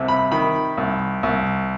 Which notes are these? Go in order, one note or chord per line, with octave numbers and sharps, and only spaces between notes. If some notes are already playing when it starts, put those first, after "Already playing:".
Already playing: C2 C3
B5
D#3 B5
C2
C2